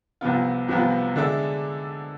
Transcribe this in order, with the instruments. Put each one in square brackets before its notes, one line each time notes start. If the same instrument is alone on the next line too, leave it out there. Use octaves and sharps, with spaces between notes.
[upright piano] C2 C3 F3 B3 F4
C2 C3 F3 B3 F4
D3 G#3 D4 A4 E5